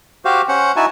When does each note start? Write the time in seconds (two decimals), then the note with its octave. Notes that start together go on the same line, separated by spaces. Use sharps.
0.25 F#4 G4 C5 F5
0.48 C#4 C5 F#5
0.76 D#4 E4 F#4 G#5 A5